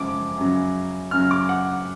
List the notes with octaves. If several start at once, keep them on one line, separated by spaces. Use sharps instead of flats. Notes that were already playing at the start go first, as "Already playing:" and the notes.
Already playing: F#2 C#3 F3 G#3 D6
F#2 C#3 F#3
F#2 C#3 F#3 F6
D6
F#5